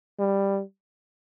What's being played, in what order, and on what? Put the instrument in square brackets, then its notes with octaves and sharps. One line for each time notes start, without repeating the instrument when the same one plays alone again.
[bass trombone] G3